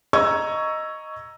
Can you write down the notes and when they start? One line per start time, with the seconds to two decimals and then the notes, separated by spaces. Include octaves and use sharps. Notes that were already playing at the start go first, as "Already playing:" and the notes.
0.13 D#5 A#5 C#6 E6 G#6